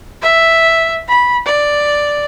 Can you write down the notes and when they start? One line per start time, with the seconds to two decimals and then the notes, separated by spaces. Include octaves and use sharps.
0.22 E5
1.08 B5
1.46 D5